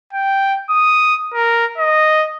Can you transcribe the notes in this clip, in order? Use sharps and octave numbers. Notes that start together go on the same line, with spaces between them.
G5
D#6
A#4
D#5